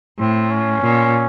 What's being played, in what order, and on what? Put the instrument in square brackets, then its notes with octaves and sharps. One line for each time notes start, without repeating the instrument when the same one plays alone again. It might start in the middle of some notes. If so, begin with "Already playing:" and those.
[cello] A2 [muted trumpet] C4
[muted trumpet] C#4
[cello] A#2